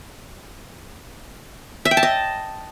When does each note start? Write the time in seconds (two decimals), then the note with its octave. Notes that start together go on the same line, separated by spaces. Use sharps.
1.85 E5
1.91 G5
1.97 A5
2.03 D#5